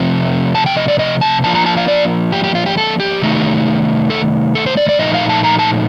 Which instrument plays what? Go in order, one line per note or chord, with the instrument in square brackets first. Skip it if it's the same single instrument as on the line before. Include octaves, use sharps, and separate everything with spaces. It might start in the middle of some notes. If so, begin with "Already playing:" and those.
Already playing: [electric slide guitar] C3 F3 A3 C4 F4
A5
G5
D#5
D5
D#5
A5
F3 A#3 D4 F4 A5
A#5
A5
F5
D5
G4
G4
F4
G4
A4
G4
C3 D#3 A3 D#4
A4
A4
C5
D5
D5
A#2 F3 A3 D#4 D#5
F5
A5
A#5
A5